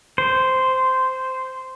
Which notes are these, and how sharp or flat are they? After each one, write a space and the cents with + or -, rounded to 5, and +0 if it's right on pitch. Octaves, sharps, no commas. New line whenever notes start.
C5 -10